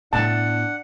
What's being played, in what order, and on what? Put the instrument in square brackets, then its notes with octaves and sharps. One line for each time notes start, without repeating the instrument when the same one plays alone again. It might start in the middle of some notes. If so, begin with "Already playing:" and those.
[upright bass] A2 B3 [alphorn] D4 [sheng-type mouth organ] F#5 [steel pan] A5